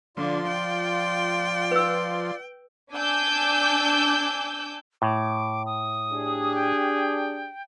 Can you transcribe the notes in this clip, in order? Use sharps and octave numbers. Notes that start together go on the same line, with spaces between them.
D3 F3 F4 D5 C6
G5
B4 E6
D4 G#5 D6 E6 G6
A2 D6
D#6
D4 G4 G#4
G5